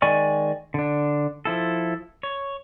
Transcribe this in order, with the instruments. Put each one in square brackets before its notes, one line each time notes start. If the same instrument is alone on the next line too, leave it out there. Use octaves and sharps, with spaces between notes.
[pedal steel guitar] D#3 G#3 D5 G#5 C#6
D3 D4
F3 E4 A4
C#5